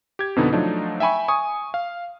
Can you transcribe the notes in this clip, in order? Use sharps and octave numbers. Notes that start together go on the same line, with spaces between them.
G4 G#6
F2 B2 D3 B3 D#4
F3 F#3 A3 D4 D#4
E5 G5 G#5 B5 C#6
G#5 C#6 D#6
F5